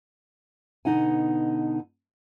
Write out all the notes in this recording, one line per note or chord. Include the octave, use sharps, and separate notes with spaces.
B2 D3 D#4 F#5 G#5